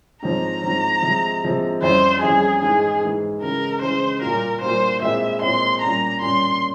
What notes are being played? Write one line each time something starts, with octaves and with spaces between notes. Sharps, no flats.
G#2 F3 C4 A#5
G#2 F3 C4
C3 F3 G#3
C3 F3 G#3
F2 E3 G3 C#4 E4 C5
F2 E3 G3 C#4 E4 G#4
G#2 E3 G#3 G#4
G#2 E3 G#3
C#3 E3 G#3 A#4
C#3 E3 G#3 C5
A#2 G3 A#3 F4 A#4
A#2 G3 A#3 F4 C5
A#2 G#3 C4 E4 E5
A#2 G#3 C4 E4 C6
A#2 G3 C#4 A#5
A#2 G3 C#4 C6